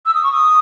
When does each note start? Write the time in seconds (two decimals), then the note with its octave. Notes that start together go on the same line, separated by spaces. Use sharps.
0.05 E6
0.14 D#6
0.23 C#6
0.32 D#6